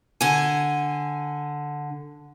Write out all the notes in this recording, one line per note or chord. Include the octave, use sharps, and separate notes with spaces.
D3 G#5